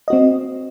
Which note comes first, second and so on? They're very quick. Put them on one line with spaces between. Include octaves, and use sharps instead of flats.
D#5 F#4 C4